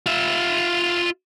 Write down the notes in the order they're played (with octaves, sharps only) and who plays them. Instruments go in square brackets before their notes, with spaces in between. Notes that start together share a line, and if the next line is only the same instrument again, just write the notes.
[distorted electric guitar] F4 E5